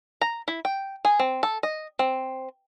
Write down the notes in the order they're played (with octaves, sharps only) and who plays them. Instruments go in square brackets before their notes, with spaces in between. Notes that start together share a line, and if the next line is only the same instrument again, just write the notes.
[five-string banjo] A#5
E4
G5
G#4
C4
A4
D#5
C4